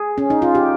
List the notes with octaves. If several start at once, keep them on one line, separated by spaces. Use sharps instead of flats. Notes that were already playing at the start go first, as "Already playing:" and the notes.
Already playing: G#4
C#4
D#4
F4
G4